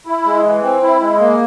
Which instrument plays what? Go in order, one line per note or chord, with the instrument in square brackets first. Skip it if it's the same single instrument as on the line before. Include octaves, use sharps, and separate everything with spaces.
[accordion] E4
G#3
E3
C4
E4
G#3
A#3